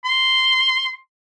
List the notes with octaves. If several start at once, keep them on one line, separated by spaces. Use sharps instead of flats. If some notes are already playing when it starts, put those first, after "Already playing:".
C6